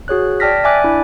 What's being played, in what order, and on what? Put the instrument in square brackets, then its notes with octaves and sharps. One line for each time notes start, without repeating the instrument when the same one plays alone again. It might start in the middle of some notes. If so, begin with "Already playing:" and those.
[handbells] F#4 G#4 C#5 F#6
D5 G5 A5 F6 A#6 B6
D5 E5 G#5 D6 F#6
D4 E4